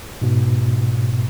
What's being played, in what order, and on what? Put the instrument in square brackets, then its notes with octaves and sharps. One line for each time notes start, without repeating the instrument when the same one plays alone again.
[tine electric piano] G#2 B2